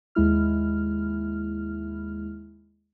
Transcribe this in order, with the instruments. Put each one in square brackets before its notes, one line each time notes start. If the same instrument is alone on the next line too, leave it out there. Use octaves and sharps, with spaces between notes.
[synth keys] D#2 G#3 E4 F6